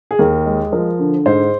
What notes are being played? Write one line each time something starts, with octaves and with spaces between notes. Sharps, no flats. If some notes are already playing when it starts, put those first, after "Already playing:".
G#4
D#2 A#4
G#3
F3 A#4
D3
G#2 C5